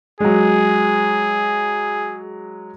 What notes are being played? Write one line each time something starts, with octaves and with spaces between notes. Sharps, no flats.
F#3 G#3 G#4